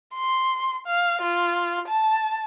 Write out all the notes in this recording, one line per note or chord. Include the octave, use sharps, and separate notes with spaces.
C6
F5
F4
A5